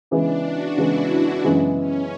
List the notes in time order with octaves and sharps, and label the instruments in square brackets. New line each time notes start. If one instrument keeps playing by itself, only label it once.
[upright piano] C#3 E3 G#3 B3 [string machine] D4
[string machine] F#4
[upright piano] C#3 E3 G#3 B3 [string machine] E4
[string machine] D4
[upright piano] F#2 C#3 E3 G#3 B3
[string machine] C#4